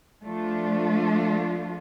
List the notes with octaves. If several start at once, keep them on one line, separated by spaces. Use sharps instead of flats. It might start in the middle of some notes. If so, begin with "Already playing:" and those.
F3 A3 D4 F4